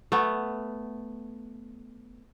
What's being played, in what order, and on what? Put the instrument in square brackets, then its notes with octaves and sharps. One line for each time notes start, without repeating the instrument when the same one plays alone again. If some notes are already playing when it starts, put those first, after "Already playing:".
[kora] A3 B3